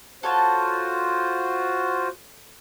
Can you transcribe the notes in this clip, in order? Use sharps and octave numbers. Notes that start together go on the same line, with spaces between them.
F4 F#4 A4 C5 C#5 A5